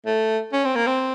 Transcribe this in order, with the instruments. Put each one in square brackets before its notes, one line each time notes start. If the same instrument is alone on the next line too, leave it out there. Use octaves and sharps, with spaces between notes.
[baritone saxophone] A3
C#4
C4
A#3
C4